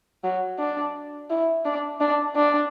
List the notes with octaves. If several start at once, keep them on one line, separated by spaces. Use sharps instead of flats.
F#3
D4
E4
D4
D4
D4